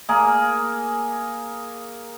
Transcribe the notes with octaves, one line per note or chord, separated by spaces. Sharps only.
A#3 G#4 A#4